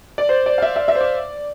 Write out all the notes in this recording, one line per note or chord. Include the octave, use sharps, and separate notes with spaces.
D5
C5
D5
F5
E5
E5
E5
C5
D5